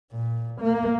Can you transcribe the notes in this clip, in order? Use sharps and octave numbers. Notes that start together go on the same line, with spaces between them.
A#2
A#3